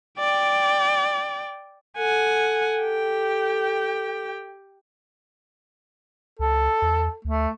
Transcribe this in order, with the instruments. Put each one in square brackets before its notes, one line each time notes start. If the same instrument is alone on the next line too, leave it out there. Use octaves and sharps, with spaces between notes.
[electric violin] D5 G5
[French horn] A4 [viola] F#5 G#5
[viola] G4 G5
[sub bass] C#2 [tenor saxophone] A4
[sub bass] E2
[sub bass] D2 [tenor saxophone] A3